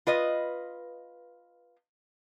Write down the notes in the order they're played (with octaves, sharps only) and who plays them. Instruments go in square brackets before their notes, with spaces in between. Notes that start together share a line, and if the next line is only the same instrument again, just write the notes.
[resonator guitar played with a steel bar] F4 B4 D#5